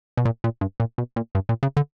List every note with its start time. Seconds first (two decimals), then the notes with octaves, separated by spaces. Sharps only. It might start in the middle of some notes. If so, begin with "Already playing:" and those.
0.17 B2
0.25 A#2
0.44 A#2
0.61 G2
0.80 A#2
0.98 B2
1.16 A#2
1.35 G2
1.49 A#2
1.63 C#3
1.77 D3